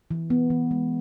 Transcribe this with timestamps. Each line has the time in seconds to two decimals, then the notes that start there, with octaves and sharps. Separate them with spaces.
0.11 E3
0.30 B3
0.50 E3
0.71 G#3